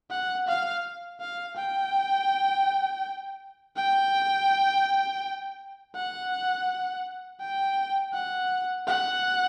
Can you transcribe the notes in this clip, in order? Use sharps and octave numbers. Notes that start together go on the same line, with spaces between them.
F#5
F5
F5
G5
G5
F#5
G5
F#5
F#5